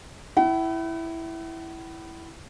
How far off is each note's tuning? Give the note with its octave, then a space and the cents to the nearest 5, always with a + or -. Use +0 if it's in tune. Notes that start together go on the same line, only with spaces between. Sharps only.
E4 +0 F#5 +45